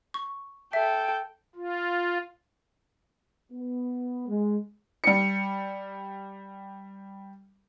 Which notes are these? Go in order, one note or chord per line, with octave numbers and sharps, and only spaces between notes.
C#6
A4 E5 G5
F4
B3
G#3
G3 C#7